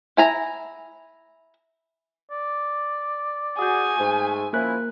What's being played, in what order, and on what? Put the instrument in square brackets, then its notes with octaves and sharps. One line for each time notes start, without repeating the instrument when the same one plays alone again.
[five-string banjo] E4 G#5 A#5
[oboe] D5
[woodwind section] F#4 G#4 [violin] G#5 [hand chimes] D#6 G6
[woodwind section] G#2 A3
[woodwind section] F3 C#4 E4 [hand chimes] A#3 A#4 F#6